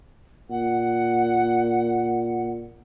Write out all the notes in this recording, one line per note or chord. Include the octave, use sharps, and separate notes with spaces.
A#2 F#5